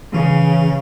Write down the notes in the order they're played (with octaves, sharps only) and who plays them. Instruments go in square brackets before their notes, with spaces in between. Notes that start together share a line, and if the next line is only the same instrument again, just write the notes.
[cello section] C#3 [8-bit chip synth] E3